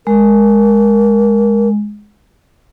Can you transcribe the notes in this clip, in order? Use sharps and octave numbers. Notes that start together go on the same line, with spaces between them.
G#3 A#4